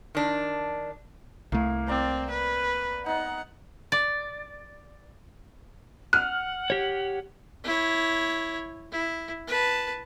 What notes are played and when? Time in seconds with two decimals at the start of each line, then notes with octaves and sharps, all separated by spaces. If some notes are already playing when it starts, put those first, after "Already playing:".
0.15 D#3 D4
1.52 C2 A2 A3 A#3
1.88 C4 D5 A#5
2.31 B4
3.06 B3 D#4 F#5
3.92 D5
6.13 F#5 F6 F#6
6.70 G4 C#5
7.64 E4 C#5
8.92 E4
9.47 B4 A5